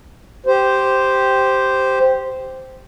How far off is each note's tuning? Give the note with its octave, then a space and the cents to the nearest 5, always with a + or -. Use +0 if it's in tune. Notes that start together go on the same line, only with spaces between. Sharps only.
G4 -5 C5 -5